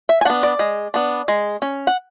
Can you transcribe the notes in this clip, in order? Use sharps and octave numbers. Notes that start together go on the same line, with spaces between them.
E5
G#5
B3 D4 F#5
D5
G#3
B3 D4
G#3
C#4
F#5